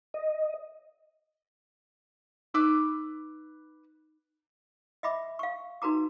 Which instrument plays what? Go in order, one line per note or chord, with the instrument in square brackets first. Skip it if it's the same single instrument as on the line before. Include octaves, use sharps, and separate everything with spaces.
[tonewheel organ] D#5
[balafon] D#4 [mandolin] B4 D6 E6
[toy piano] D#5 E5 B5 D6
F5 C#6
D#4 F#4 B4 A#5 D6